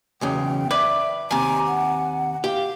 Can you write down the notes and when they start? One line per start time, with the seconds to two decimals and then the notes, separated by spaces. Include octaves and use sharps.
0.21 B1 E2 C#3 G5
0.71 B4 D5 E5
1.31 D#2 C3 G#5 A#5 D6
1.67 F#5
2.44 G4 F5